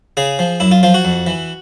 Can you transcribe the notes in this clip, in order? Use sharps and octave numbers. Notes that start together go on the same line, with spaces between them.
C#3 G#4
F3
F#2 E4
F4
F3 F4
F#4
F2
E3